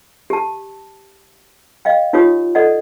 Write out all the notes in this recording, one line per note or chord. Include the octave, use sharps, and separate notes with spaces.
G4 A5
D#5 F5 G5
D#4 F4 G4 C#5 D#6
A4 D5 D#5 F#5